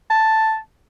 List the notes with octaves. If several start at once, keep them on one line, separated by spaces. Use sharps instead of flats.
A5